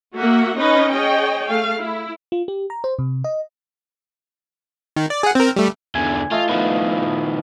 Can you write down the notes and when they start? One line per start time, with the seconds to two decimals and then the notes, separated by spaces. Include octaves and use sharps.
0.15 A#3 F#4 E5 F#5
0.57 C#4 D#4 B4 C#5 D#5
0.93 G#4 C#5 D#5 G5
1.49 A3 F5
1.78 E4
2.32 F4
2.48 G4
2.70 A#5
2.84 C5
2.99 C3
3.24 D#5
4.96 D#3
5.10 D5
5.23 G#4 F#5
5.35 C4 A#4
5.56 G3 A3
5.95 E2 D3 G#5
6.31 A3 F4 D#5 F5
6.49 D#3 F3 B3